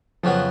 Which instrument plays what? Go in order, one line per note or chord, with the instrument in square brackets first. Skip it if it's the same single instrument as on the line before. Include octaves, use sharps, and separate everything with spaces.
[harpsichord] F2 C#3 F#3 B3 [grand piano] F3